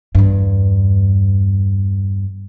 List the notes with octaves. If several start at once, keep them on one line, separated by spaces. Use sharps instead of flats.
E2 G2